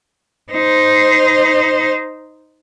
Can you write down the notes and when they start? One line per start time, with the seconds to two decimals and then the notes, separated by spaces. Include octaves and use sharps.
0.52 D#4 C5